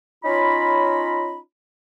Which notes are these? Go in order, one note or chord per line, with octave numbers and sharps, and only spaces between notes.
C#4 D#4 F4 C#5 A#5 B5